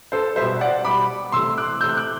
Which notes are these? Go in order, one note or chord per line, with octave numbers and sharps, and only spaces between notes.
A4 C5
B2 G3 C5 E5
D5 F#5
B2 G3 B5 D6
C3 E3 A3 C6 E6
D6 F#6
C3 E3 A3 E6 G6
D6 F#6